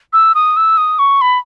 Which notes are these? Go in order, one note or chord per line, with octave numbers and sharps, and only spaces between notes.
E6
D#6
E6
D#6
C#6
B5